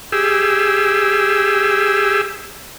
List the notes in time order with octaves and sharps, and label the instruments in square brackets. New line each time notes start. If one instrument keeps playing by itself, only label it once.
[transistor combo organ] G4 G#4 E6